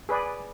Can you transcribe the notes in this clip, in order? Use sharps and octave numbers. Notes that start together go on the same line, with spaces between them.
G#4 B4 D5